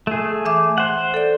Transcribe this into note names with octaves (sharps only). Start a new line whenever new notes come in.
A3 G#4
E3 E5 D6
C5 F#5
A4 D5